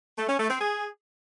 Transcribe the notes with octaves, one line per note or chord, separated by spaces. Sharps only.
A3
C#4
A3
C4
G#4